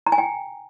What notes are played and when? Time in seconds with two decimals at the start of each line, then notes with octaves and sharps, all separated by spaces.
0.07 A#5
0.12 G#5
0.18 G5